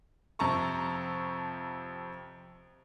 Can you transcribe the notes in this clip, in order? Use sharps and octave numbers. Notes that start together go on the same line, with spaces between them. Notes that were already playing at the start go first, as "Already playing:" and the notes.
F2 C3 A5 A#5 C#6